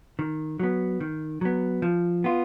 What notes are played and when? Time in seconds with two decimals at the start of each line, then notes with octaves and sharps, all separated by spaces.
0.19 D#3
0.59 F#3 B3
1.00 D#3
1.41 F#3 B3
1.82 F3
2.24 B3 F4